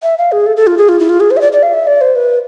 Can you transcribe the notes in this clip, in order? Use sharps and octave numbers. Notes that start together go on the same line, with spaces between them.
E5
F5
G#4
A4
A4
F4
G#4
F4
E4
F4
G#4
C5
E5
D5
D5
F5
E5
D5
C5
B4